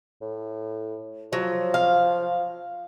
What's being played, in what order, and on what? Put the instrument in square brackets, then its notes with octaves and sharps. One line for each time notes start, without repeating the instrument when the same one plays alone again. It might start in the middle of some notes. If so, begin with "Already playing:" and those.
[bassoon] A2
[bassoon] F3 [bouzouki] F#3
[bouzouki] F5